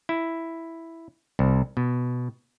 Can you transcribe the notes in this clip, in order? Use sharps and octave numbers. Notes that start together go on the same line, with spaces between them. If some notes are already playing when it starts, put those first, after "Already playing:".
E4
C2
B2